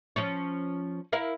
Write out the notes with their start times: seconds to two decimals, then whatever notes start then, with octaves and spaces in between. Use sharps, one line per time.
0.16 F3 C#4 C#5
1.12 E4 A#4 F5